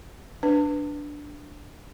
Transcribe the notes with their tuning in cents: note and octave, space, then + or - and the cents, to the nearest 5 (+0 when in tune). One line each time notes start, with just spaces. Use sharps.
D4 +0 B4 +0